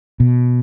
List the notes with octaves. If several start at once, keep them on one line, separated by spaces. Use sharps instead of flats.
B2